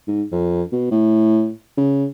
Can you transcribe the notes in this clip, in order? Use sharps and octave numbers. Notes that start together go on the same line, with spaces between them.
G#2
F2
B2
A2
C#3